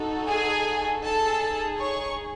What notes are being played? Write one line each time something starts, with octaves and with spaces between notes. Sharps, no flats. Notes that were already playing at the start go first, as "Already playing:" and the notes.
Already playing: D#4 F#4 A4
G#4 G#5
D#4 G#4 A4 A5
C#5 C#6